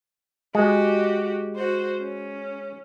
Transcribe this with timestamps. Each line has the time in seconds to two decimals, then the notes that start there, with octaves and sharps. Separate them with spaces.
0.55 G#3 F#4 G4
1.56 F#4 C5
1.99 C#4